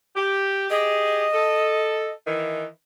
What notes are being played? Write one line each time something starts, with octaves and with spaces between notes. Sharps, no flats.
G4
G4 G#4 D#5
A4
D#3 E3